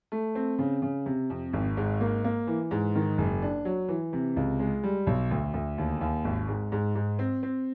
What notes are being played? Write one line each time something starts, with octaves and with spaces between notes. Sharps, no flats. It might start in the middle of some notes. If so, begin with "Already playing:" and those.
A3
C4
C#3
C#3
C3
F2
G#1
G#2
A#3
A#3
E3
G#2
D#3
F#1
D4
F#3
E3
C3
C#2
G#3
G3
B1
D2
D2
D#2
D#2
G#1
G#2
G#2
G#2
C4
C4